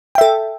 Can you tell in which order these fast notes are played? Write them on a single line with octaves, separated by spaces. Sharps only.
G5 E5 A4